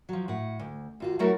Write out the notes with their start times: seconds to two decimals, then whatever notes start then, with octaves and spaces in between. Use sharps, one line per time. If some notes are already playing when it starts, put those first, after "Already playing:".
0.09 F3 F#3
0.28 A2 F#5
0.59 D2
1.00 D#2 F4 F#4
1.19 F#3 A3 E4 F#4 A4 A#4